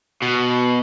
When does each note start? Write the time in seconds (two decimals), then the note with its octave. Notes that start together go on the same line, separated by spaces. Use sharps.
0.22 B2